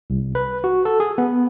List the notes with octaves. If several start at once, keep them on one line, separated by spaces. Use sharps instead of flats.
C2
B4
F#4
A4
G#4
B3